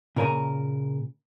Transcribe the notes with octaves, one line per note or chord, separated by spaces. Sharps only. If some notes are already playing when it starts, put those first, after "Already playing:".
A#2 C#3 A#4 C#5 G#5 A#5